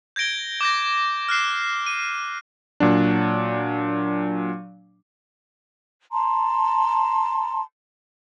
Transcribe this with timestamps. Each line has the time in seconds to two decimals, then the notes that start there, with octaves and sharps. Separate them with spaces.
0.16 G6 G#6 A#6 D7 G7
0.61 D6 G6 A#6
1.29 F6 F#6 C7 E7
1.86 D#7
2.80 A#2 F#3 D4
6.12 A5 A#5 C6